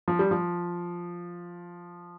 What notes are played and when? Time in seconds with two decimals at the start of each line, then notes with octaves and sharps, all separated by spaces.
0.08 F3
0.19 G3
0.31 F3